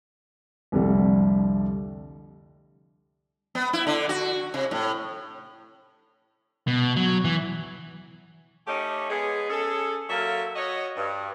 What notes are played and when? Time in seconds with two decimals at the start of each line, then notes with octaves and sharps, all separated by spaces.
0.72 C2 F2 D3 G3 A3
3.55 B3
3.73 E4
3.87 D3
4.09 F#4
4.54 C3
4.71 A2
6.67 B2
6.97 F#3
7.24 E3
8.67 A3 C#4 D#4 G4
9.10 G#3 B3 G#4
9.50 C#4 G#4 A4
10.09 F#3 A#3 F4 A4 E5
10.56 F#4 C#5 D#5
10.97 G2